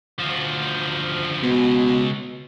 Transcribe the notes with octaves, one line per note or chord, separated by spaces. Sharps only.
D2 F3
C#2 B2